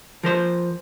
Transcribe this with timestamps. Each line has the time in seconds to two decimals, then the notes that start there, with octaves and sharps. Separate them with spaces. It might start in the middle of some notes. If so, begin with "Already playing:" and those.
0.23 F3 A#4 C5